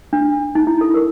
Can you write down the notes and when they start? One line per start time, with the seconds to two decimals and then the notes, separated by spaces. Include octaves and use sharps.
0.13 D4
0.55 D#4
0.67 E4
0.81 A4
0.94 A#4